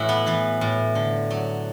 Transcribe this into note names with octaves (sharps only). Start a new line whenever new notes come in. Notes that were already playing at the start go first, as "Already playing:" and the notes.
Already playing: A2 E3 E4 F#4
B3
E3 B3
A2
D3
F#3